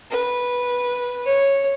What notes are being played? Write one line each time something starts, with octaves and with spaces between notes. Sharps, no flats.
B4
C#5